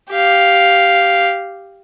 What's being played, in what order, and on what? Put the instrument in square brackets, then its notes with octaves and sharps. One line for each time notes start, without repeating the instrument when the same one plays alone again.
[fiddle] G4 F5